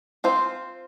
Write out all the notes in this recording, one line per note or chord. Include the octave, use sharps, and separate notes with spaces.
C4 F4 C5